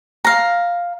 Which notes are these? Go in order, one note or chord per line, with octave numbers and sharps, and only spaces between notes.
F5 A#5